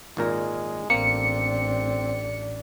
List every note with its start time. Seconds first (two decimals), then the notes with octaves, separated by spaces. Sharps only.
0.17 G#1 A#2 G#3 A#4
0.90 A1 A#3 C4 D4 C#7